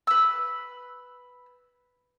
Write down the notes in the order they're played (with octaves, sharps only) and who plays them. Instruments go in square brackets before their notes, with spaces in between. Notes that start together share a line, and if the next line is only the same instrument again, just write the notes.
[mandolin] B4 E6